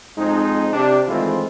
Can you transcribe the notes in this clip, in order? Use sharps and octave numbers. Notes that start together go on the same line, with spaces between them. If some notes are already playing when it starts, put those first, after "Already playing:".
F2 G#3 C4 D#4
C3 D4
D#3 E3 G#3 A3 C4 F4